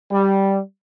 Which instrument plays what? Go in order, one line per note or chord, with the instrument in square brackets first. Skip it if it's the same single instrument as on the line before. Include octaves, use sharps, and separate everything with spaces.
[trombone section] G3